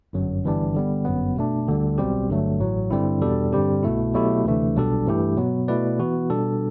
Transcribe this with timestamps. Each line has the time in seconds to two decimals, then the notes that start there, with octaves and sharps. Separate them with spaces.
0.13 G1 F#2 F#3
0.43 G1 G2 E3 G3 D4
0.75 D3 G3 B3
1.05 G1 F#2 F#3 B3
1.36 B2 A3 D4
1.67 D2 D3 G3
1.98 B1 B2 G3 C4 G4
2.28 G1 G2 D3 F#3 A3
2.60 A1 A2 F#3
2.91 G2 D3 G3 C4 E4
3.21 E2 B2 G3 D4 A4
3.53 G2 D3 G3 C4 G4
3.83 C2 B2 A3 E4
4.14 B2 F#3 A3 E4 G4
4.44 D2 C3 E3 A3 D4
4.75 B1 B2 G3 D4 A4
5.06 G2 E3 A3 E4 G4
5.37 B2 F#3 B3
5.68 B2 A3 E4 B4 D5
5.99 E3 B3 F#4
6.30 B2 G3 D4 A4